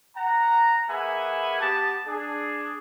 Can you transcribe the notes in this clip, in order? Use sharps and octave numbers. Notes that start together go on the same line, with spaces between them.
F#5 A#5
A#3 G#4 B4 E5 F#5 G#5
B3 G4 A5
D4 G#4